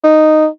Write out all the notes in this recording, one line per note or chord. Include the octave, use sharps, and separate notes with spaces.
D#4